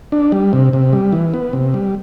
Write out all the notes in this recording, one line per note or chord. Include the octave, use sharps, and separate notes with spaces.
D4
G3
C3
C3
G3
E3
B3
C3
G3